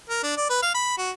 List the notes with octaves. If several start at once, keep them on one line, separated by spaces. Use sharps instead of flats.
A#4
D4
D5
B4
F5
B5
F#4